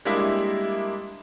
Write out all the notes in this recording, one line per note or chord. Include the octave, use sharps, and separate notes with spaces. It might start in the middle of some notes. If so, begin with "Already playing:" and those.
G3 G#3 A#3 D4 E4 E5